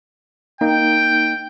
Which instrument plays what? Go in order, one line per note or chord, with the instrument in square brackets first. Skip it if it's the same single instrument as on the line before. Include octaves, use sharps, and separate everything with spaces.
[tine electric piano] A#3 D#4 [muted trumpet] G5